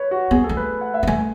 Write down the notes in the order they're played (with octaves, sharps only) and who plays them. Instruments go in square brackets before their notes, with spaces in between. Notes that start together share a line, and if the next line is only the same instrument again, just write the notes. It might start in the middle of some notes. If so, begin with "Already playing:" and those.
Already playing: [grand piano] B4 C#5
F#4
[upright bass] B3 [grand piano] G#4
[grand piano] A4
[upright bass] A3
[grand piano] B4
F#5
E5
[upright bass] B3
[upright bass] A3 [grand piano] G#5